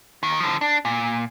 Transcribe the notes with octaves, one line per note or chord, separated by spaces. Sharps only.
D#2 D#3
D3 F3
D4
A#2